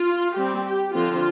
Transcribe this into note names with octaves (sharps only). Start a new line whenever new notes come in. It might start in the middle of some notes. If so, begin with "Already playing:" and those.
Already playing: F4
G3 C4 G4
G4
D3 F3 C4 F4